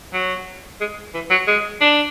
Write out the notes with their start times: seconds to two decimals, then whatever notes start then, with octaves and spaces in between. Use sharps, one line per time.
0.13 F#3
0.81 G#3
1.14 E3
1.30 F#3
1.47 G#3
1.81 D4